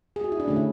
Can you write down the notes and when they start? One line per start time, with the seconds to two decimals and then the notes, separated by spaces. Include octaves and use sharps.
0.16 G#4
0.24 F#4
0.32 E4
0.40 D4
0.48 D3 A3 C#4
0.56 E4